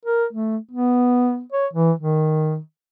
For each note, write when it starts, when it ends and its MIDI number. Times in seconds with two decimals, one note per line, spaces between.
0.05 0.25 70
0.33 0.58 57
0.71 1.42 59
1.52 1.67 73
1.73 1.92 52
1.99 2.58 51